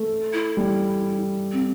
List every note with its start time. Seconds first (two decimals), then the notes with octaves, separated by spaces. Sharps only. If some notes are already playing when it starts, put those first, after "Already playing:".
Already playing: A3
0.33 E4
0.57 G3
1.52 C4